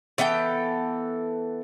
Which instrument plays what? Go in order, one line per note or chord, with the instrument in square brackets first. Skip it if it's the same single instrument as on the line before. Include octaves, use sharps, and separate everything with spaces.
[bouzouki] E3 B3 A4 G5